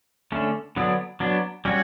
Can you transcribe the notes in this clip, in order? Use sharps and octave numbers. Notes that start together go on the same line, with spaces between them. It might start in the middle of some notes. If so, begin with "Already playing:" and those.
D3 A3 C#4
D3 F#3 B3 D4
F#3 B3 D4
G3 C#4 F#4 C#5